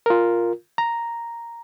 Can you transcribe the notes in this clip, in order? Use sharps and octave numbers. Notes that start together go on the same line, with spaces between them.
F4 A#4
A#5